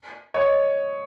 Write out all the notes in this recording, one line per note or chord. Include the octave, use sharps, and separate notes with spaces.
C#5 D#5